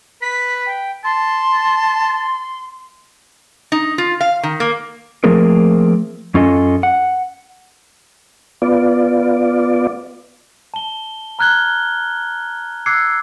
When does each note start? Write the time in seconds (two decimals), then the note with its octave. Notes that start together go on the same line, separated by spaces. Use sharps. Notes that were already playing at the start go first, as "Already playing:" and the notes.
0.22 B4 B6
0.66 G5
1.04 A5 C6
3.72 D#4
3.98 F4
4.21 F5
4.43 D#3
4.60 A#3
5.24 F3 A3 A#3 C4 G#4 A#4
6.34 F#2 C#4 F4 A4 D#5 G#5
6.83 F#5
8.62 B3 F4 D5
10.74 A5 G7
11.39 A#5 F6 F#6 G#6 G7
12.86 D6 E6 F#6 G#6 C7 C#7